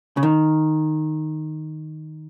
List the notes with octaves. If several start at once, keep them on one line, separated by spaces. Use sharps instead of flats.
C#3
D#3